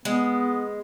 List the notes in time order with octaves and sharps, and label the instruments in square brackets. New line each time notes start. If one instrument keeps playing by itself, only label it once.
[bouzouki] G#3 [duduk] B3